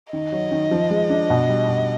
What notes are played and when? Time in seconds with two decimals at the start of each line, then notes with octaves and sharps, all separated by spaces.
0.13 D#3 D#5
0.32 F#3
0.51 D#3
0.71 F3
0.90 G#3
1.10 D4
1.30 B2
1.49 G3
1.68 B2